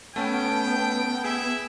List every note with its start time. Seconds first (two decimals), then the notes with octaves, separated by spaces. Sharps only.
0.16 A3 B3 C#4 G5 A5
1.24 E4 G#4 E5